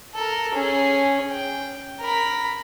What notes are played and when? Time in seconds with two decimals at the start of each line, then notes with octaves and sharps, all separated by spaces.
0.15 A4 A#4
0.54 C#4 G#4
1.31 G5
2.00 A#4 B5